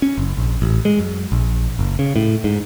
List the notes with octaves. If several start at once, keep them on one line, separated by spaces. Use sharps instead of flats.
C#4
F#1
A#1
A1
G#3
F#2
A#1
F#1
C#3
A2
G#2